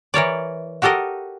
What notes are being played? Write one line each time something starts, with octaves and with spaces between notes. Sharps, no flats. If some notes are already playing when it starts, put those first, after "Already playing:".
E3 A#4 C#5 D5
F#4 G4 A4 A#4 D#5